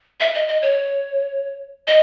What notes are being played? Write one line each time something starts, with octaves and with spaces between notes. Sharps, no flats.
E5
D#5
D#5
C#5
D#5